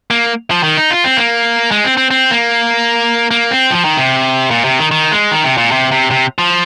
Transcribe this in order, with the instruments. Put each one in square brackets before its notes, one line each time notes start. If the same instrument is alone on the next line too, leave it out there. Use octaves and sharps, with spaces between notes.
[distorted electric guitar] A#3
F3
D#3
D#4
F4
C4
A#3
G#3
C4
C4
C4
A#3
A#3
C4
F3
D#3
C3
A#2
C3
D#3
D#3
G#3
D#3
C3
A#2
C3
C3
C3
F3